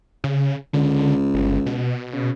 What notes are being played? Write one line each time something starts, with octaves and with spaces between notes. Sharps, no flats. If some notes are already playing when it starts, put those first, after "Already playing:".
C#3
C#2 D3
G1
B2
C#3